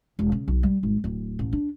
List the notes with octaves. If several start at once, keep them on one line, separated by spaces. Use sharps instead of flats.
E1
C#3
B1
G3
G#1
D1
A1
D4